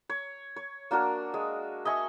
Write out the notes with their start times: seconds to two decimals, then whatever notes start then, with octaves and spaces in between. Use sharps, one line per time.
0.09 C#5
0.56 C#5
0.91 A#3 D4 F#4 A#4
1.34 G#3
1.85 D#5 E5 G#5 C#6